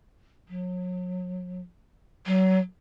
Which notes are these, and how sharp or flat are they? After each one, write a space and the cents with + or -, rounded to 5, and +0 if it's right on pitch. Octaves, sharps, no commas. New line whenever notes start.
F#3 -35
F#3 +25